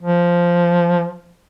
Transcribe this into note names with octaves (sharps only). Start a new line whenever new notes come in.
F3